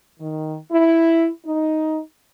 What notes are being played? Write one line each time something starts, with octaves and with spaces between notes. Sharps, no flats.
D#3
E4
D#4